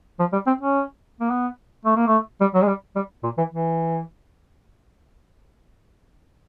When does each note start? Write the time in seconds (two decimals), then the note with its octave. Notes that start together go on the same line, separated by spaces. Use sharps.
0.20 F3
0.33 G3
0.47 C4
0.61 C#4
1.20 A#3
1.30 B3
1.85 A3
1.96 A#3
2.07 A3
2.41 G3
2.54 F#3
2.62 G#3
2.68 G3
2.96 G3
3.23 A#2
3.38 E3
3.51 E3